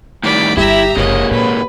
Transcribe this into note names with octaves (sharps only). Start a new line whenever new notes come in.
A2 D#3 G3 D5 B6
G1 G3 E4 G4 E5 A#5
F#1 G#2 C3 G#3 A#3 C#5 D#5
A#2 B4